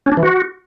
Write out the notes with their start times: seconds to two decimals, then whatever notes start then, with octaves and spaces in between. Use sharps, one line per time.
0.06 C#4
0.12 D4
0.17 E3
0.23 F#4